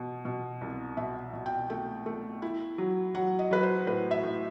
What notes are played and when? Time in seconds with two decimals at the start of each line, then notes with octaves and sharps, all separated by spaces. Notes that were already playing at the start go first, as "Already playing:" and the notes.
Already playing: B2
0.25 B2
0.61 C2
0.97 B2 E5
1.33 B2
1.46 G5
1.70 A3 G5
2.06 A3
2.42 E4
2.78 F#3
3.15 F#3 F#5
3.39 D#5
3.51 F#3 B4
3.63 C5
3.87 A2 B4
4.11 E5
4.23 A2